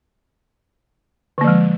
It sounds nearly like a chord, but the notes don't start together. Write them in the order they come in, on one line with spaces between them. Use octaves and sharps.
D3 A#3 F3 G#3